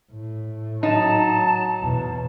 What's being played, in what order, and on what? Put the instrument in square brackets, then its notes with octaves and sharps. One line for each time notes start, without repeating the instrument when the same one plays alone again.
[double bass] A2
[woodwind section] F#3 A5 [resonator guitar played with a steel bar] D#4
[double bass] E2 B2